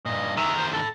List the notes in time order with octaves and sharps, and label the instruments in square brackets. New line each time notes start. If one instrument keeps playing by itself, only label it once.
[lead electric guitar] G2 A#2 [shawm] D#5
[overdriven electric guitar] E2 D#3 [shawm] E5 [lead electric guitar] A#5
[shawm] C5
[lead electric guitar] A4 B5 [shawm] A5